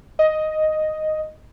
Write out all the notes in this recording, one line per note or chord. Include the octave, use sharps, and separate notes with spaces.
D#5